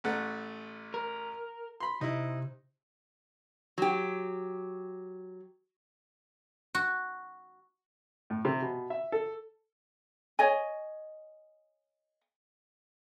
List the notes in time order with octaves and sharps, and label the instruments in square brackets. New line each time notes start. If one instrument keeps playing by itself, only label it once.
[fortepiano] A1 A3 F#5
[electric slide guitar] A#4
[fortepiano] B5 C6
[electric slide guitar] C3 [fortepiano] D#4 E4
[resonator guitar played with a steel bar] F#3 G4
[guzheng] F#4
[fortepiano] A2
C3
B2
E5
A4
[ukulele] C#5 D#5 G#5